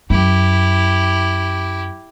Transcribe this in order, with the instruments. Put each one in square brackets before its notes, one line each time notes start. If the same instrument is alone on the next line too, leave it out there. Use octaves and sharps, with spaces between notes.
[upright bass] F#2 [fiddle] E4 G4